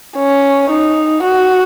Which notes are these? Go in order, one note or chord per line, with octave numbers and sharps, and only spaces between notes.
C#4
D#4
F#4